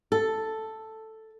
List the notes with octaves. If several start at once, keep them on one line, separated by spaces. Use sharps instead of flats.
A4